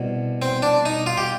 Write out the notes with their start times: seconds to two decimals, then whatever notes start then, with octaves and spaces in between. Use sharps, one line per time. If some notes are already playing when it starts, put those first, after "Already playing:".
Already playing: C2 B2
0.42 C4
0.62 D4
0.85 D#4
1.06 F4
1.17 G4